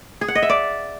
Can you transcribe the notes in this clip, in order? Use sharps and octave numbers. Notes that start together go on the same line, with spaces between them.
G#4
F#5
D#5
E5
D5